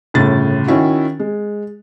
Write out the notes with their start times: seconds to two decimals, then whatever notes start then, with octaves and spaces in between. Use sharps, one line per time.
0.14 G1 A2 C#3 A6
0.67 D#3 C#4 E4 F#4
1.19 G#3